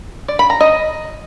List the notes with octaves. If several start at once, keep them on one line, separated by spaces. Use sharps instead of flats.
D5
B5
A#5
D#5